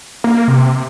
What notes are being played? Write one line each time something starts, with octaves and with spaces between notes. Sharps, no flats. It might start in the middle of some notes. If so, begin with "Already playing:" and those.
A#3
C3